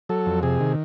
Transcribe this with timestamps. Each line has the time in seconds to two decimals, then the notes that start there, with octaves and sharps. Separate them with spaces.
0.09 F#3 A4
0.26 F2
0.43 C3 G#4
0.60 D#3